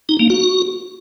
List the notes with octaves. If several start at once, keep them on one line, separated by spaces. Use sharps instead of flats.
D#4
A#3
F#4